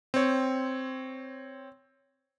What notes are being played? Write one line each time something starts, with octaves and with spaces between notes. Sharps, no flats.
C4 C#5